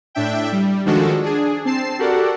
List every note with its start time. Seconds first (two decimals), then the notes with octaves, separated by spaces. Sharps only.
0.15 A2 D4 E5 G5
0.52 G3
0.85 D#3 F3 G#3 D4 F#4 A4
1.23 D4 G#4
1.65 C4 A5 C7 E7
1.99 F#4 G4 A4 A#4 D5 F#5